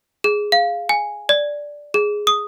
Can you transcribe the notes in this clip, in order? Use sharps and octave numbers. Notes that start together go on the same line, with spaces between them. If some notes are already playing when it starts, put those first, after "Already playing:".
G#4
F5
G#5
D5
G#4
D#6